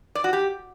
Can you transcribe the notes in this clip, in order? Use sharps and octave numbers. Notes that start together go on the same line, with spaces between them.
D5
F#4
G4